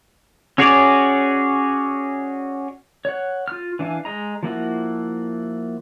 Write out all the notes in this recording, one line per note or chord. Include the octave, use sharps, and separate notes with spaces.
C#4 F#4 G#4 C#5 D5
C#5 F#5
F4 F6
E3 D4 E4 F5 G#5
G#3 D#5 A#5
F3 A#3 E4 F#4